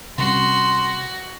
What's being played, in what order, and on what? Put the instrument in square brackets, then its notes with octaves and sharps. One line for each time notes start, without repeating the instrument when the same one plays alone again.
[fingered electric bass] C3 G3 C#4 [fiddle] F#4 [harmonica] C6